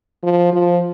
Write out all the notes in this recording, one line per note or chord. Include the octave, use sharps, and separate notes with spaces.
F3
F3